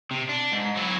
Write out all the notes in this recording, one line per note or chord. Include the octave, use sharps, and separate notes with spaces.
C3
D4
G#2
F#3 E4